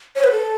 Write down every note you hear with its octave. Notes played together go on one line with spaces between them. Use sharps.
C#5
B4
A4